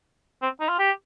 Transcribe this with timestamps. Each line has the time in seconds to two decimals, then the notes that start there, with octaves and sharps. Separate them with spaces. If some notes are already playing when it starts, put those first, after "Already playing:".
0.42 C4
0.60 D#4
0.69 F4
0.79 G4